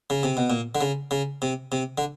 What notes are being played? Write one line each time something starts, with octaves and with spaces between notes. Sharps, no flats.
C#3
C3
B2
A#2
D3
C#3
C#3
C3
C3
D3